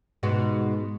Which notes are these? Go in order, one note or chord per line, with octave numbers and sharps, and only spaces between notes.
G#2 B2 F#4